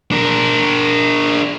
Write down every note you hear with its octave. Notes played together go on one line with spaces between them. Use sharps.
D4 A#4